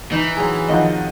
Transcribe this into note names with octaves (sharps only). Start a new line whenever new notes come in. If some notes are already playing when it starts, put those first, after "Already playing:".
E3 D#4
F#3 C4 G#4 A#5
D#3 F3 D#5 F#5